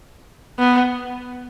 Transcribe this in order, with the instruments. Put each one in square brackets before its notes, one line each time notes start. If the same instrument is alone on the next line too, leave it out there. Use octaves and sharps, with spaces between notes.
[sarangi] B3